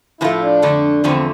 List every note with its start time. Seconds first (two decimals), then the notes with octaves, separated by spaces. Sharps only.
0.21 A2 F3 C4 E4 F4 A4
0.41 D4
0.62 F2 D3 A3
1.04 E2 D3 F3 A3 C4